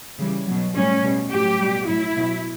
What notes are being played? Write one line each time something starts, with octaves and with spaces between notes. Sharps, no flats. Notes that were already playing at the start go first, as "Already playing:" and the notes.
C#3 E3 G3
B2 F#3
A2 G3 C#4
B2 G3
A2 F#3 G4
B2 G3
A2 F#3 E4
B2 F#3